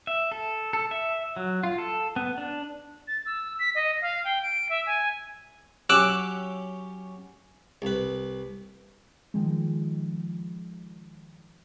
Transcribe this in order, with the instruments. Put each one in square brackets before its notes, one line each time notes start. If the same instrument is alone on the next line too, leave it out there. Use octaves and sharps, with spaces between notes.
[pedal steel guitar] E5
A4
A4
E5
F#3
F4
A4
B3
D4
[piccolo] A6
E6
B6
D#5
F5
G5
D7
E5
G#5
[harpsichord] F#3 C#4 G4 [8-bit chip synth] D6 E6 F#6
[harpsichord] C2 B4
[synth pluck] D#3 F3 G#3